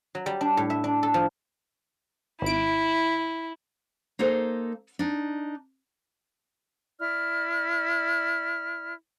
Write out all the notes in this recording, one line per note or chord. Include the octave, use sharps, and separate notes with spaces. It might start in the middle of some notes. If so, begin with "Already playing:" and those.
F#3
G3
D4
A2
E5
D4
A4
F3
G#1 E4 D7
A#3 D#4 A4 A#4 C5
D4 D#4
E4 D5 F6